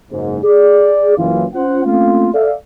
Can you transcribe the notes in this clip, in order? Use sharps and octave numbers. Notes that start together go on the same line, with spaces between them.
F#1 G#2
G#4 D5
F#1 E3 F4
C#4 F4 C5 F#5
A3 A#3 C4 C#4 F4
A4 D5 E5 F5